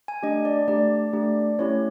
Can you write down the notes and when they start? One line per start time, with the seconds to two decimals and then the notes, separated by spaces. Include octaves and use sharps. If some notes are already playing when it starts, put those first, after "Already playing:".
0.08 G#5
0.23 A3 D4 G4 D#5
0.45 D5
0.68 A3 D4 G4 D5
1.13 A3 D4 G4
1.59 A3 C#4 E4 G4 C#5